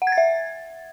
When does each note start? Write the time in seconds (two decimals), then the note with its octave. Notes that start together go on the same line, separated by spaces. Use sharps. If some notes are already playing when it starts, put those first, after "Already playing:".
0.02 F#5
0.07 G#6
0.12 A6
0.18 E5